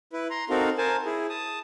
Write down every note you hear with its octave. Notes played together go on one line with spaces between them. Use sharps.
E4 B4
A#5 C6
C4 D#4 F#4 A4 A#4 F5
A#4 C5 G#5 A5
E4 G#4
A5 D#6